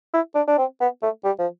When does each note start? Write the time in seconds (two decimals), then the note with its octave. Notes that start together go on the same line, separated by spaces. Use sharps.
0.13 E4
0.35 D4
0.47 D4
0.58 C4
0.81 B3
1.02 A3
1.24 G3
1.39 F3